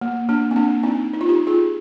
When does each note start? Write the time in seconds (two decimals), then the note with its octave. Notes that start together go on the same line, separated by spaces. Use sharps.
0.01 A#3
0.29 A#3 D4
0.51 C4
0.56 A#3 D4
0.83 C4 D#4
1.13 D#4
1.21 F4
1.29 D#4 G4
1.47 F4 G#4